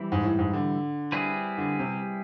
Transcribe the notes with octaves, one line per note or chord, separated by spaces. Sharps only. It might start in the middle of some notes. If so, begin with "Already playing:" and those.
Already playing: E3 G3 C4
G#2
A2
G#2
D3
G3 C4 E4 G#4 B4
D3
C3